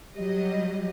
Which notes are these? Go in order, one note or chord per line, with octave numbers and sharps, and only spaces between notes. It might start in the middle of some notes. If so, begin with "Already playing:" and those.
F#3 G3 D#5